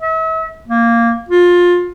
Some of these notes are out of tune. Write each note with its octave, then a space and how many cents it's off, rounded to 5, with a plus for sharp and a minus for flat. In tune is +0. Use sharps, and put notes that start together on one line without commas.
E5 -40
A#3 -5
F4 +20